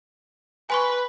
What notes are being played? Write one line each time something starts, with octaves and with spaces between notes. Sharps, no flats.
B4 G#5 C6 C#6